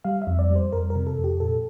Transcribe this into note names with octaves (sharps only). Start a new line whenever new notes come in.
G3 F5
E5
F2
D5
G3
C5
F2 A#4
A#4
C3
A4
F2
G4
A#2 A4